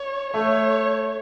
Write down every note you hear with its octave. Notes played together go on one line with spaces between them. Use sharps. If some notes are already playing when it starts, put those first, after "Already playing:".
Already playing: C#5
A3 C#5